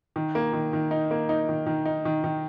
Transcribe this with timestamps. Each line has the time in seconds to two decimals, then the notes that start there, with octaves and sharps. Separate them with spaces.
0.16 D#3
0.35 A#3
0.53 D#3
0.73 D#3
0.91 D#4
1.11 A#3
1.29 D#4
1.49 D#3
1.66 D#3
1.86 D#4
2.05 D#3
2.24 D#3